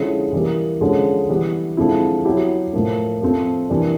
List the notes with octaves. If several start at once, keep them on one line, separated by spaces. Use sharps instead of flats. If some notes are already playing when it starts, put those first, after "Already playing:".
Already playing: D3 F3 G#3 C#4 E4
E3 G3 A#3
D3 F3 G#3 C#4
E3 G3 B3
D3 F3 G#3 C4 E4
F#3 B3 E4 G4
A2 F3 A#3
F3 A3 C4
E3 G3 A#3 D4